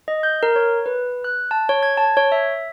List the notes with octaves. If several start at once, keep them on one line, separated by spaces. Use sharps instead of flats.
D#5
G6
A#4
C#5
B4
F#6
A5
C#5
G#6
A5
C#5
E5